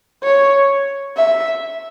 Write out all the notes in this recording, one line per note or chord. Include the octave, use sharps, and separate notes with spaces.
C#5
E5